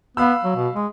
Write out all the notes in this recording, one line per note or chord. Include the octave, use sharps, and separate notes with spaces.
B3 F5 B5 E6
F#3
B2
G#3